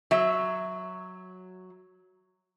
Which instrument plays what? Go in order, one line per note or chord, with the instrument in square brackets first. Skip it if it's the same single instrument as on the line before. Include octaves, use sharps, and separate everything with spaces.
[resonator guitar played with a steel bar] F#3 E5